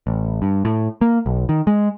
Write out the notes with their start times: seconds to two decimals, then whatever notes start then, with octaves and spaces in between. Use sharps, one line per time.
0.07 A1
0.42 G2
0.65 A2
1.01 A#3
1.26 B1
1.49 D#3
1.67 G#3